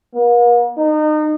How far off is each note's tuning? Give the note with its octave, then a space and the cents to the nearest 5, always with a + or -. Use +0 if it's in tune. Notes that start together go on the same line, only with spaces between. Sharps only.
A#3 +45
D#4 -30